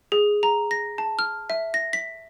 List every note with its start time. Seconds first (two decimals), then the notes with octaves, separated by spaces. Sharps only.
0.12 G#4
0.43 A#5
0.71 A#6
0.98 A5
1.19 F6
1.50 E5
1.74 A#6
1.93 B6